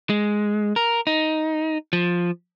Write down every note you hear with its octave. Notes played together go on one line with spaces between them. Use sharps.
G#3
A#4
D#4
F3